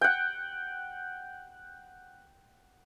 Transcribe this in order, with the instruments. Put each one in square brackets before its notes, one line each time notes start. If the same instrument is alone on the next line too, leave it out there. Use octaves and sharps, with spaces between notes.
[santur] F#5 G5